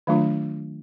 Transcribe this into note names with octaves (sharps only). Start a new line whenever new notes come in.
D#3 F#3 A3 D4 F4